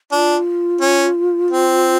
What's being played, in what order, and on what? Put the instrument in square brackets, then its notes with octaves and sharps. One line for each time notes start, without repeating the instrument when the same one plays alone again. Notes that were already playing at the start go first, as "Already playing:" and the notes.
[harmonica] D4 [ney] F4
[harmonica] C#4
C4